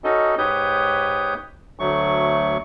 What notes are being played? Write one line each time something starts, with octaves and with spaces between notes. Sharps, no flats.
C#4 D#4 F#4 A4 D#5
G#2 G4 B4 C#5 D#6 G6
D2 F#3 A3 C#6